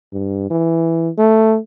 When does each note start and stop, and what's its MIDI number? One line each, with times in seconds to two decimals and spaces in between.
0.13 0.47 43
0.51 1.09 52
1.18 1.57 57